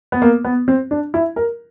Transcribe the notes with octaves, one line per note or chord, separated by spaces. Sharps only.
B3
A#3
B3
C4
D4
E4
A#4